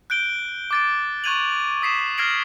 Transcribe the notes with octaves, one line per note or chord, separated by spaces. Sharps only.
F#6 G6 D7 G7
D6 A6 D7
C#6 F#6 G#6 D#7 F7 F#7
D#6 B6 C7 E7
F6 G#6 A#6 C7 D7 F#7